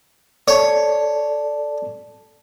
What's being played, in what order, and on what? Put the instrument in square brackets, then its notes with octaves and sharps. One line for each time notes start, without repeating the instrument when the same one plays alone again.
[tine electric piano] A4 D5 A5 [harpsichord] C#5